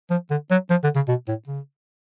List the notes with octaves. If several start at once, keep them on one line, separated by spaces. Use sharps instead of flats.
F3
D3
F#3
F3
D3
C#3
B2
A2
C#3